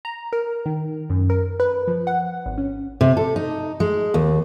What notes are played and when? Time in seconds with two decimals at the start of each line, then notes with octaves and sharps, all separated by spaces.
0.05 A#5
0.33 A#4
0.66 D#3
1.10 F#2
1.30 A#4
1.60 B4
1.88 F3
2.07 F#5
2.46 G#1
2.58 C#4
3.01 C3
3.17 A4
3.36 D#4
3.80 G#3
4.14 D#2